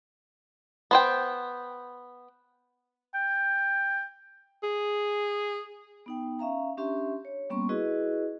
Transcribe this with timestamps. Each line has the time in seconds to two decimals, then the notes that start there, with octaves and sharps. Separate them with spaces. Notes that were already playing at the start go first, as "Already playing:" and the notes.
0.91 B3 C5 G5
3.14 G5
4.63 G#4
6.06 B3 D#4 G5
6.39 C#4 E5 F5 A#5
6.77 C#4 D4 G4 E5 C6
7.25 C#5
7.50 G3 A#3 B3 C#4 C6 C#6
7.69 E4 F#4 G#4 B4 D#5